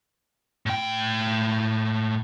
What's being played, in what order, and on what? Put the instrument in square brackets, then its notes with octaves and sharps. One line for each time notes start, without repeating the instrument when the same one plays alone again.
[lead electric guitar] A2 G5